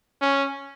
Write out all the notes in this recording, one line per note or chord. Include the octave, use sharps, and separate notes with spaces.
C#4